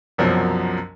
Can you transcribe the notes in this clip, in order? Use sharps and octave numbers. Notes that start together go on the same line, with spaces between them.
C2 F#2 B2 F3 F#3